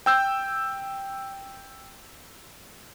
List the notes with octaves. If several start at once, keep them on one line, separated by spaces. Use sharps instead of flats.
G5 E6 G6